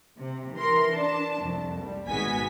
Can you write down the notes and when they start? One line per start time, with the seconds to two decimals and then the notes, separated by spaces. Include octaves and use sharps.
0.17 C3
0.56 E3 A#4 C6
0.91 D4 A5
1.39 C2 F2
1.79 G3
2.08 G#1 B2 G#3 B3 G#5 B6